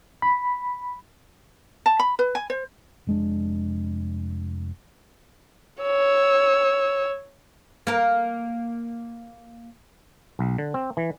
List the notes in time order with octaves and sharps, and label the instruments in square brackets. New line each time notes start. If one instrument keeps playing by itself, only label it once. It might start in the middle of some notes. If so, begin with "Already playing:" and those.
[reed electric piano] B5
[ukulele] A5
B5
B4
G#5
C5
[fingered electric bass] F1 G#3 D4
[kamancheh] C#5 E6
[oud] A#3 A#4
[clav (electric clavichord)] B1
D3
C4
E3